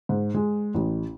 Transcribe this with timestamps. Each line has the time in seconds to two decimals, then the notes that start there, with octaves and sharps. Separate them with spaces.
0.09 G#2
0.34 G#3
0.75 A1